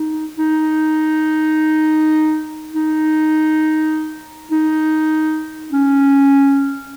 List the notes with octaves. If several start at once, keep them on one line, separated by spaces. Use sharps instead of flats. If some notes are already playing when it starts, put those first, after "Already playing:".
Already playing: D#4
D#4
D#4
D#4
C#4